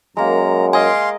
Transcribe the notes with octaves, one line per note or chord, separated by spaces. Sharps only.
F#2 G#3 A#3 A#5
D#5 F5 G#5 C6 D6